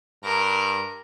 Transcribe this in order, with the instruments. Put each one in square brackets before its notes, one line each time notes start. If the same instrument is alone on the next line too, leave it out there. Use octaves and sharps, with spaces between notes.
[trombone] G2 [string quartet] A#4